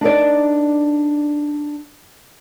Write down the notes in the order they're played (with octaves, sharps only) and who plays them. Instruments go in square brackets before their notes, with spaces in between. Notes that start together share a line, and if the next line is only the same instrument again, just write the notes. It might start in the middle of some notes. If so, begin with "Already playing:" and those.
[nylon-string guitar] D4 D#4 A#4 D5